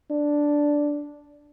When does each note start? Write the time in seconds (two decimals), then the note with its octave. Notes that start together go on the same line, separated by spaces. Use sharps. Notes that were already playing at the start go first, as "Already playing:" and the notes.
0.11 D4